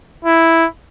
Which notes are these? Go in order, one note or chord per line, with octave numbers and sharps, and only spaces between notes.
E4